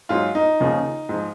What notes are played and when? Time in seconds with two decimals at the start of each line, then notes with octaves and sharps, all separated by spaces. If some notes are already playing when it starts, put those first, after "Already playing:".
0.09 G#2 F#3 F4
0.35 D#4
0.60 D#2 C#3 F3
1.09 G#2
1.14 F3